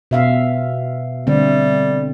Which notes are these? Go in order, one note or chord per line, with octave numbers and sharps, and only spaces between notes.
B2 E5 F5
D3 G3 A3 C4